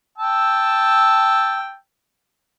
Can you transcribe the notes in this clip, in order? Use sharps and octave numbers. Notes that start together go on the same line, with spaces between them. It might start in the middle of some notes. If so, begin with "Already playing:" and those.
G5 A5 E6